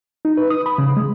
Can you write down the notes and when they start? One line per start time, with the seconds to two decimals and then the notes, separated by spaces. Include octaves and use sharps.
0.25 D#4
0.37 B4
0.50 D#6
0.66 B5
0.78 C#3
0.97 G#3